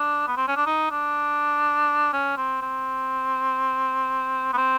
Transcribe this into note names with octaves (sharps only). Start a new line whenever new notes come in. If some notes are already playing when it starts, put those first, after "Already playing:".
Already playing: D4
B3
C4
C#4
D4
D#4
D4
C#4
C4
C4
B3
C4